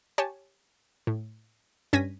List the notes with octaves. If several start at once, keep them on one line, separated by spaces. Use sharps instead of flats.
G4 C#5 G#5 A5
A2
G2 C#4 G#6 A#6 B6 D#7